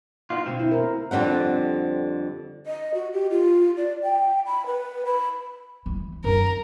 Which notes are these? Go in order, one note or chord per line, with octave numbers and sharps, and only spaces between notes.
B3 D#4 F4
D2 B2 C4
E4
A#4 C5
F2 D3 G3 C4 F#5
D#5
F#4
G4
F4
D5
G5
B5
B4
B5
E3 G#3
F#2 D4 A#4